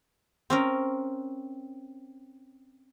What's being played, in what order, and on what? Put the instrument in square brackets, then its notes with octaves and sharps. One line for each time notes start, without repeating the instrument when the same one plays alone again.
[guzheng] C4 C#4 A#4